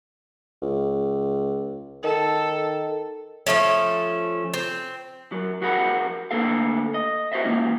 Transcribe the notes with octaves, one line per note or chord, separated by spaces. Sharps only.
C#2
D#3 A4
F3 F#3 A3 C#4
C4
F#2 F#3
F2 F#4 G#4 A#4 F#5 B5
D2 B2 D3 A#3 A4 F5
D#5
F#4 C5 D#5 E5
E3 G#3 A#3 C#4 F4